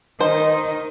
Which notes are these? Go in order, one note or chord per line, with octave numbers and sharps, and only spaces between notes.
D#3 D#4 C5